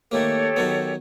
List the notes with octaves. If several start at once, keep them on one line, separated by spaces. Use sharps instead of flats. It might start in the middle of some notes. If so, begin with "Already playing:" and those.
D#3 A3 A#3 G4 A4 C#5
D#3 F#3 B3